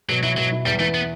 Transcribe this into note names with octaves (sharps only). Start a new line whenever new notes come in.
B2 F#3
F#3 E4
B2 F#3
E4
E2 G3
E3 A3
B3